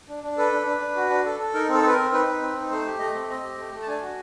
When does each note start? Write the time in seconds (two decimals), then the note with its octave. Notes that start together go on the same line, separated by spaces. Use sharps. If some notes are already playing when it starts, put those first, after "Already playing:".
0.09 D4
0.23 D4
0.38 A4 B4
0.52 D4
0.66 D4
0.81 D4
0.96 F#4
1.10 D4
1.25 A4
1.39 A4
1.54 D#4 A#4
1.68 C4
1.74 A4
1.83 C4 B4
1.92 A#4
1.98 C4
2.12 D#4 B4
2.27 D#4
2.42 C4
2.56 D#4
2.70 A3 C5
2.85 G4
2.99 A3 D#5
3.14 C4
3.29 C4 D#5
3.43 G4
3.58 A3
3.72 A3
3.82 A5
3.88 D4 G#5
4.02 F#4